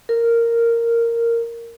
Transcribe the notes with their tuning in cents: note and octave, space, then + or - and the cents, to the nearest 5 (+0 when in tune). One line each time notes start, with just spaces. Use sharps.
A#4 -5